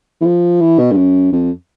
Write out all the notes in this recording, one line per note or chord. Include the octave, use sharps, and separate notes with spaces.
E3
F3
E3
B2
G2
F#2
F2